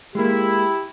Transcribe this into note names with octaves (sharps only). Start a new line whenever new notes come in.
G#3 A#3 E4 G4